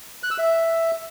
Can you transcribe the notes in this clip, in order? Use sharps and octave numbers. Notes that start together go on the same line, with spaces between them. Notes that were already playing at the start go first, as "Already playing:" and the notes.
F#6
E6
E5